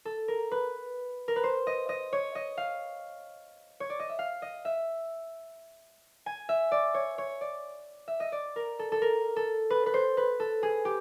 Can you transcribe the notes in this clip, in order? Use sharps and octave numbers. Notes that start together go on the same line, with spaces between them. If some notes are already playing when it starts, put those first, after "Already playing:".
A4
A#4
B4
A#4
B4
C5
D#5
D#5
C#5
D#5
F5
C#5
D5
D#5
E5
F5
D#5
E5
G#5
E5
D5
C#5
C#5
D5
E5
D#5
D5
A#4
A4
A4
A#4
A4
B4
B4
C5
B4
A4
G#4
G4